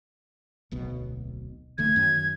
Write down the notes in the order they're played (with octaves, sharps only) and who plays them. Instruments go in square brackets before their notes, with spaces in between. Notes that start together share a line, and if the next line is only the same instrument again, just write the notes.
[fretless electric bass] D1 B1 B2
[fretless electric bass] D1 D3 A3 [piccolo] G#6
[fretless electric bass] F#2 D#3